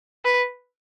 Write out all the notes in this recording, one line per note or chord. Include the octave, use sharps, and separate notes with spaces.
B4